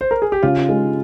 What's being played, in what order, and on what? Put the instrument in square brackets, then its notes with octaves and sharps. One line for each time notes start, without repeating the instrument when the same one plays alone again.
[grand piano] C5
A#4
G#4
G4
[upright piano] C#3 [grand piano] F4
[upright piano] G#3